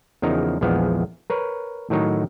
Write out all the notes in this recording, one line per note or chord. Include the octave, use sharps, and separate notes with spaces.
E2 C#3 F3 D#4 A#4 A#5
A#1 E2 F3 G#3 B3 F5
A#4 B4 C#5
A2 D#3 F#3 D#4 C#5